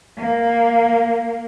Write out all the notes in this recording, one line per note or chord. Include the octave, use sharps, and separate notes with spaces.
A#3